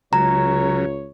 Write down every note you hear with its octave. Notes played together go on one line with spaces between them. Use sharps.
C#2 C#3 F#3 C#5 A#5